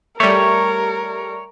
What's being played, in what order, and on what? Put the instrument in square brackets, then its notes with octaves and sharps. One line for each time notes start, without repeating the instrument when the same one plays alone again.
[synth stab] G3 A3 [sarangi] A#4 [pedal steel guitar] C#5